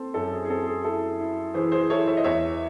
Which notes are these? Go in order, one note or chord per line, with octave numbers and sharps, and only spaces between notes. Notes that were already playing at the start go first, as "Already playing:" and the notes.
Already playing: C4 A4 C5
F#2 A4
G#4
G#4
C4 A4
G#4
E4 A4
E4
E3 G#4 C5
G#4 C5
E4 A4 C#5
C#5 E5
D#5
E2 C#5 E5